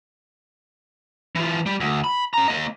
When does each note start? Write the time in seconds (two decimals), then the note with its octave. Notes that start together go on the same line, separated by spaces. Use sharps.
1.36 E3 F4
1.66 G3
1.80 D2
2.04 B5
2.34 C#4 A#5
2.48 A#3 D#5